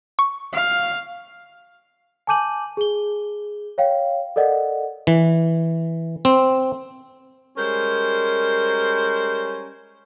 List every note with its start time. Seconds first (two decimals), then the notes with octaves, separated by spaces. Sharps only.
0.19 C#6
0.53 F5
2.27 G#5 A5 D6 G6 D#7 F#7
2.77 G#4 G7
3.78 C#5 F5 G5
4.36 A4 A#4 D5 D#5 F#5
5.07 E3
6.25 C4
7.57 G3 G#3 C#4 A#4 C5